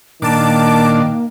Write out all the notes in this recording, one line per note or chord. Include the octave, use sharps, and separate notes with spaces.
A#2 D#3 A#3 D4 A5 D6